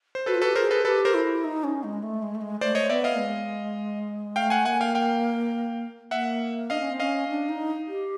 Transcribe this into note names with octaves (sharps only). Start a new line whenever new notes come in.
C5
F#4 A4 B4
F4
F#4 A4 B4
G4
G#4 A#4 C5
A4 B4
G4 A4 B4
A#4 C5
E4
D#4
C#4
G#3
A3
G#3
A3
G#3
A3 C5 D5
C#5 D#5
B3 D5 E5
D#5 F5
G#3
A3 F5 G5
F#5 G#5
A#3 F#5 G#5
F5 G5
F5 G5
A#3 E5 F#5
D4 D#5 F5
C#4
C4
C#4 D#5 F5
D4
D#4
G4